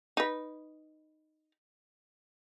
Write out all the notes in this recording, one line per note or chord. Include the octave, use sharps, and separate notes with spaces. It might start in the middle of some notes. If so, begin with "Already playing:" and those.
D#4 B4